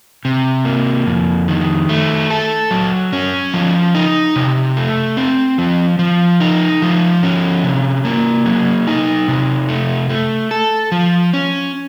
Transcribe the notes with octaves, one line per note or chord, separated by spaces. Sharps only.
C3
A#3
F2
D#3
A3
A4
F#3
C#4
F3
D#4
C3
A3
C4
F3
F3
D#4
F3
C#4
C3
A#3
F#3
D#4
C3
A3
A3
A4
F3
C#4